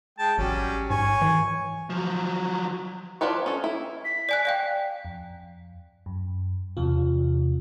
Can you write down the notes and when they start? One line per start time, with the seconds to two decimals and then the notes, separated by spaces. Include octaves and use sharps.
0.19 G#3 G5 A5
0.38 A1 F#3 G3 C#4
0.90 G#2 C#5 G#5
1.22 E3
1.90 F3 F#3
3.21 F3 D4 F4 B4 C#5
3.46 C#4 A4
3.64 E4
4.05 B6
4.29 D5 G#5 F#6
4.45 D5 F5 G5
5.05 F2
6.06 F#2
6.77 E2 C3 F4